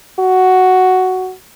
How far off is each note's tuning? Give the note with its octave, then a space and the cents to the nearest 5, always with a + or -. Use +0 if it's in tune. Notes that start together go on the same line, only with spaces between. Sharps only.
F#4 +5